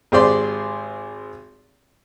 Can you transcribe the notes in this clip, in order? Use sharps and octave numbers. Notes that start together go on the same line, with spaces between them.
G#1 G4 G#4 C5 D5 C6